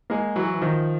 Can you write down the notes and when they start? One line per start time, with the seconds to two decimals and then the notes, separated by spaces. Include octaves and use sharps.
0.10 G#3 A#3
0.36 E3 F#3
0.54 E3
0.62 D#3 F3